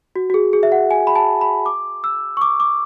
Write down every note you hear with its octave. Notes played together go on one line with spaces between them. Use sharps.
F#4
F#4
G#4
G#4
E5
F#5
G#5
B5
A5
B5
D6
E6
C#6
D6
D6